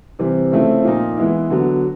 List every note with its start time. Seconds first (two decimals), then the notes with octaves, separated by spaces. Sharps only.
0.19 C3 E3 G3 C4
0.52 C#3 F3 A3 C4 E4
0.84 A#2 F3 A#3 D#4
1.17 E3 G#3 B3 E4
1.50 D3 F#3 B3